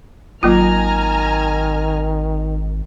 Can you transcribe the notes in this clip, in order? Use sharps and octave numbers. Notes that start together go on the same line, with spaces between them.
G#1 D#3 F#3 A#3 F4 G#5 A#5 F6